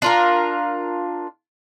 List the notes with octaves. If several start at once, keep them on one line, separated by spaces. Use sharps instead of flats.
D4 F4 A#4